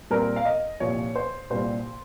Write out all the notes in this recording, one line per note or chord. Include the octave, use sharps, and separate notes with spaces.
A#2 G3 C4 A#4
F5
D#5
C2 A#2 F3 C#5
C5
C2 A#2 G3 C5